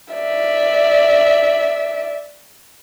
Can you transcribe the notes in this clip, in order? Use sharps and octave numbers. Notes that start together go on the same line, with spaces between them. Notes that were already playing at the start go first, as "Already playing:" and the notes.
D5 E5